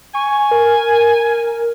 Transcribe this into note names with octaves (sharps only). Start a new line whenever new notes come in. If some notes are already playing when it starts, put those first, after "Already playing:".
G#5 C#6
A#4